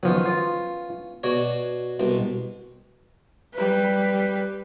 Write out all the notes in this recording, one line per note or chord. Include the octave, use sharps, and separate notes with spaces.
D#3 F3 F#3 B3 C#4
F4
B2 F#4 C#5 D5
C2 B2
G3 B4